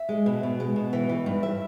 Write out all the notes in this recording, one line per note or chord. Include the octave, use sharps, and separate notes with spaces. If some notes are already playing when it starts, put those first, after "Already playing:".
Already playing: E5
G#3
B2
B2
G#3
B2
E3
E3
G2
E5